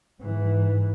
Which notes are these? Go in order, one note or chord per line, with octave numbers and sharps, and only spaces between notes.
G#2 E3